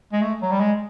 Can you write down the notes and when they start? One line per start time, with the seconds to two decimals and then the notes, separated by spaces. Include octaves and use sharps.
0.13 G#3
0.22 A3
0.42 F#3
0.51 G3
0.60 G#3